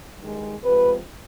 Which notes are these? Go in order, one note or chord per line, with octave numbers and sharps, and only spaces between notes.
G2 D#3 G#3
C3 F3 G#3 B4